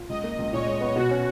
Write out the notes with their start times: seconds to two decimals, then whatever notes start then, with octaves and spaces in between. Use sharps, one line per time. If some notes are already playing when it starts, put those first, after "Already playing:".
Already playing: F4
0.09 C#2 D#5
0.24 A#3
0.38 C#2
0.53 A#2 C#5
0.67 G#3
0.81 B3
0.96 B2 F#4
1.11 C#4